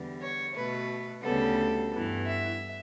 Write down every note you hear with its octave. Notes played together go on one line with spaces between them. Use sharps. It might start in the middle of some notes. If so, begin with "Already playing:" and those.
Already playing: E2 D3 G3 B3
C#5
B2 A3 B4
D2 C#3 G3 B3 A4
G2 E3 B3
E5